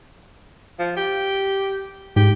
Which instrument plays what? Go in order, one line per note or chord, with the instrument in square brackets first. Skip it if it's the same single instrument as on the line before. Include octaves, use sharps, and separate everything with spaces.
[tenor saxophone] F3
G4
[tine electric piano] G#2 [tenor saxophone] G4